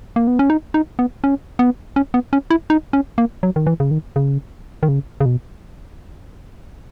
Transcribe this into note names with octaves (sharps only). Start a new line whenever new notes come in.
A#3
B3
C#4
D#4
D#4
B3
C#4
B3
C#4
B3
C#4
E4
D#4
C#4
A#3
F#3
D#3
E3
C#3
D#3
C#3
D#3
C#3
C#3
B2